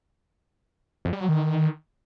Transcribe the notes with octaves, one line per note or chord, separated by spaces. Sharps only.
F2
G3
F#3
D#3